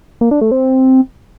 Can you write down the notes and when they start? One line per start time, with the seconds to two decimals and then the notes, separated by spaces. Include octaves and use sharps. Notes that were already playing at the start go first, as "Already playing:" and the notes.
0.21 A#3
0.31 D4
0.41 A3
0.51 C4